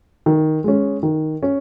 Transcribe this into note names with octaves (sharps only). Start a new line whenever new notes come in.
D#3
G#3 C#4
D#3
C#4